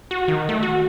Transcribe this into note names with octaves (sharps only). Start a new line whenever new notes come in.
F#4
D#3
A3
F#4